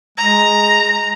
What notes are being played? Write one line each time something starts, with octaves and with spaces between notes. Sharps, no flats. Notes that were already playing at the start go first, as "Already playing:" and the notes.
G#3 A#5